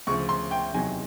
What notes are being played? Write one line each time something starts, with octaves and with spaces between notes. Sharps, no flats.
D2 C#3 F3 C#6
C6
G5
E2 C3 D#3 F#3 G#5